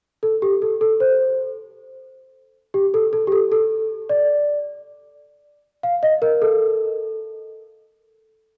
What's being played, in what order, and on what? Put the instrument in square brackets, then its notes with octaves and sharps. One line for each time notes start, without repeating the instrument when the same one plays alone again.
[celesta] A4
G4
A4
A4
C5
G4
A4
A4
G4
A4
A4
D5
F5
D#5
A#4
A4